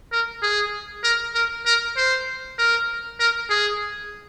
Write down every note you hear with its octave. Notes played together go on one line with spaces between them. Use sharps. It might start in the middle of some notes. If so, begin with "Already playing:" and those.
A#4
G#4
A#4
A#4
A#4
C5
A#4
A#4
G#4